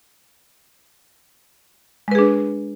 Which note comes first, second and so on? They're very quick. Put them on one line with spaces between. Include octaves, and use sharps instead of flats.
G#3 B4 G#4 D4